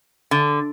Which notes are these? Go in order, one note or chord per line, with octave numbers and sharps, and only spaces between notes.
D3